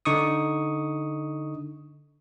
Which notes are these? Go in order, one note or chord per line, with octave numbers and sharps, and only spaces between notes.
D3 D#4 C#6 D#6